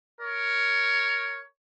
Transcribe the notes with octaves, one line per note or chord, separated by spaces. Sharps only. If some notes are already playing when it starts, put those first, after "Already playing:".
A#4 C#5